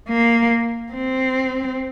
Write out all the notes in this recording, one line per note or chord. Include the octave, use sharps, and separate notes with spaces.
A#3
C4